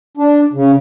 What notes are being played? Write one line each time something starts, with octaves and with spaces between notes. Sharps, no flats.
D4
C#3